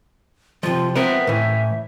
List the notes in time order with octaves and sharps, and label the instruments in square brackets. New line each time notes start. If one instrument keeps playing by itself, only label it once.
[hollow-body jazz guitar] C3 F3 [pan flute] F4
[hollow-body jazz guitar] B3 C4 A#4 [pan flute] E5
[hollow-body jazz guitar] A2 E3